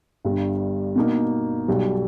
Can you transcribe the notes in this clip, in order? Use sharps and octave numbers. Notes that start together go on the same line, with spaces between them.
G1 G2 G3
B2 A#3 D#4
B1 B2 G3